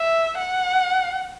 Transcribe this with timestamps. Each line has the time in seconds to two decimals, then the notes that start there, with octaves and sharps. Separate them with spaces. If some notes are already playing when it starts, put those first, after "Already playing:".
Already playing: E5
0.38 F#5